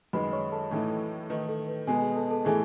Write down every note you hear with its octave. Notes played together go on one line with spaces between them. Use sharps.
F#2 D#3 G#3 B4 B5
C#5 C#6
A4 A5
A2 E3 A3 D#4
D#3 A3 D#4 B4
A4
B4
B2 G#3 B3 G#4 G#5
G#4 G#5
A4 A5
A4 A5
A2 E3 A3 G#4 G#5